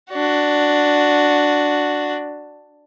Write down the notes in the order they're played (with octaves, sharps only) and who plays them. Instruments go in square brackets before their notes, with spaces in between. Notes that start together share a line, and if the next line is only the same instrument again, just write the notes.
[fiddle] D4 F#4